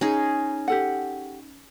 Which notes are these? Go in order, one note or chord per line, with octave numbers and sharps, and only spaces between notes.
C#4 D#4 G#4
G4 A4 F#5